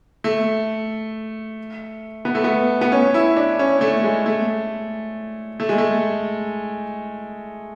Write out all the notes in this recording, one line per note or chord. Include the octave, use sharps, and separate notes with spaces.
A3
B3
A3
B3
B3
C#4
E4
D4
C#4
A3
G#3
A3
A3
G#3
A3